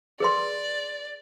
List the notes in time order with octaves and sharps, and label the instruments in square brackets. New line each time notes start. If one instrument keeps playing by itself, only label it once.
[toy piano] G#4 B4 C6 [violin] D5